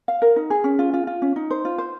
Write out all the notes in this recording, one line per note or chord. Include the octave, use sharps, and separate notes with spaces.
F5
A#4
D#4
G#4
C#4
F4
F4
F4
C#4
D#4
C5
F4
C5